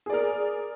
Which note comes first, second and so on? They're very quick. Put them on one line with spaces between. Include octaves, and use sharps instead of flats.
G#4 D5 A#4